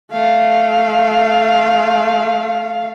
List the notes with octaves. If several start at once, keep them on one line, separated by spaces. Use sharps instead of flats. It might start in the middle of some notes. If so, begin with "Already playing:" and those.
A3 F5